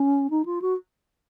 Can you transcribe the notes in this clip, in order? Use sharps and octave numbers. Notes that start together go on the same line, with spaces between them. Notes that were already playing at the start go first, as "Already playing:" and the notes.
Already playing: C#4
D#4
F4
F#4